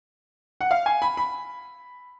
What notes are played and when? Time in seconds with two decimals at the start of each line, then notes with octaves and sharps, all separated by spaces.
0.61 F#5
0.71 F5
0.86 G#5
1.02 B5
1.17 B5